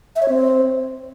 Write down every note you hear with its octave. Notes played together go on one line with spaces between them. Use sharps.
E5
C#5
C4